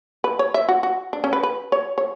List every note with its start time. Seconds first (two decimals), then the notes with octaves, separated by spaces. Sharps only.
0.24 B4
0.39 C#5
0.54 E5
0.69 F#4
0.83 F#4
1.13 D4
1.24 C#4
1.33 B4
1.43 B4
1.72 C#5
1.98 C#5